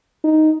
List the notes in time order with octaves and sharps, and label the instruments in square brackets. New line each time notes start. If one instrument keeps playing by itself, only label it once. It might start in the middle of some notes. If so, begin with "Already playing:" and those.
[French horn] D#4